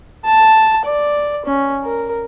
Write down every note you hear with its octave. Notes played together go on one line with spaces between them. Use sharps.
A5
D5
C#4
A#4